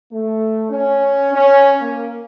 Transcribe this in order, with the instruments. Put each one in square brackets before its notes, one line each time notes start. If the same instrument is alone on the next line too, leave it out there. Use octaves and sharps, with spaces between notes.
[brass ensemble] A3
C#4
C#4
A#3